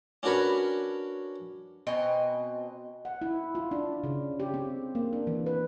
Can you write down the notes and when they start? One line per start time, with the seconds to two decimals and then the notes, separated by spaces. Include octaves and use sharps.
0.23 C#4 D4 F#4 A#4 B4 C#5
1.87 B2 C4 D#5 G#5
3.05 F#5
3.22 E4
3.55 F4
3.71 D4
4.04 C#3
4.40 G4
4.54 C4
4.95 A#3
5.13 D4
5.27 E3
5.46 B4